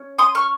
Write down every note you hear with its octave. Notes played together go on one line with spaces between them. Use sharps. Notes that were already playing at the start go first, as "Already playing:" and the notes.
Already playing: C#4
C6 D#6
C#6 F6